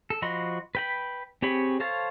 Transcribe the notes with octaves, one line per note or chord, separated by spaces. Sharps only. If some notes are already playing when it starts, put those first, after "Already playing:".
A4
F3 F#4 D#5 B5 C6
B4 G5 B5
C4 G4 G#4 C#5 B5
A4 C5 C#5 F5 A5